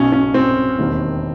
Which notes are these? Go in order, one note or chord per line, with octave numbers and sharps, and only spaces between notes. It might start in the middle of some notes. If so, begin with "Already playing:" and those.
Already playing: B1 B2 C#4
C#4
C4
E1 D#2 D#3